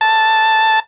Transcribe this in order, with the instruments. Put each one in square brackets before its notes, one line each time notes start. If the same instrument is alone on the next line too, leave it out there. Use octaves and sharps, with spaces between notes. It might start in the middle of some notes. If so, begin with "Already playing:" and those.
[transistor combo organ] A5